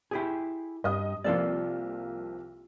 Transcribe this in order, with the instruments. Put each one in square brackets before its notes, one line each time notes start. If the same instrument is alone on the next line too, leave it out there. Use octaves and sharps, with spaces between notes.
[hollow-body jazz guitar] E4 G4 G#4
[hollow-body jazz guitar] G2 [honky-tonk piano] D#5 D#6
[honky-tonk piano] C2 F3 A#3 [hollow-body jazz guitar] F4 A4 D5